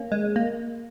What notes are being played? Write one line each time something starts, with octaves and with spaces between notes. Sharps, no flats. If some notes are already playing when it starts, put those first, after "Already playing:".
Already playing: A#3 C#4
G#3
A#3